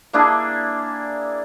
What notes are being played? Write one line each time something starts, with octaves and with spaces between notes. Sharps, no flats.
A#3 D4 E4 G#4